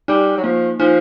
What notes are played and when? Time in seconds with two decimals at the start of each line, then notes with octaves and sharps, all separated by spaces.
0.08 G3 D#4
0.37 F#3
0.44 F3 A#3
0.80 F3 D#4